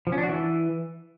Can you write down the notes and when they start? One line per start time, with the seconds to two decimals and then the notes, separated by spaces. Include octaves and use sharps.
0.07 F3
0.12 C#4
0.18 D4
0.23 F#4
0.29 E3